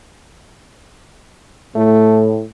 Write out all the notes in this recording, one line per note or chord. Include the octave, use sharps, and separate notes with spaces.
A2 A3